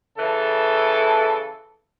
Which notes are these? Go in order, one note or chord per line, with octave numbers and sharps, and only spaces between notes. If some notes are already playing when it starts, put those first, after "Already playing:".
C#3 E3 A4